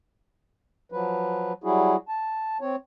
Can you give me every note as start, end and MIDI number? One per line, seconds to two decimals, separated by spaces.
0.92 1.53 53
0.92 1.53 54
0.92 1.53 71
1.64 1.96 54
1.64 1.96 55
1.64 1.96 64
1.64 1.96 66
1.64 1.96 68
2.08 2.57 81
2.61 2.76 60
2.61 2.76 73